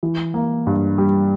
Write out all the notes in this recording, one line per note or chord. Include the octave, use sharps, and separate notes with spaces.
E3
A#3
G2
G3